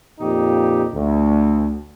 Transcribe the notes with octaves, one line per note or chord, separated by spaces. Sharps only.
F2 A#2 D#4 G4
D2